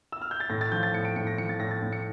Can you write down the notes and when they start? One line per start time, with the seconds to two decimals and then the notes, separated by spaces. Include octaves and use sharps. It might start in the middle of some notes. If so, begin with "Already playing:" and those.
0.12 E6
0.22 F6
0.31 G6
0.40 A6
0.50 A2 A#6
0.61 A6
0.72 F3 G6
0.83 A6
0.94 A2 C#7
1.05 D7
1.16 A2 C#7
1.27 A#6
1.38 F3 C#7
1.49 A6
1.60 A2 A#6
1.71 A6
1.82 A2
1.93 C#7